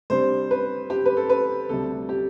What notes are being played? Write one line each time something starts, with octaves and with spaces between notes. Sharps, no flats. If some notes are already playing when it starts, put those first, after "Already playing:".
C3 G3 D4 C5
B4
G4
B4
A4
B4
D2 C3 G3 A4
G4